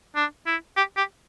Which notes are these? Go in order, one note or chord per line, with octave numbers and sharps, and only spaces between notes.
D4
E4
G4
G4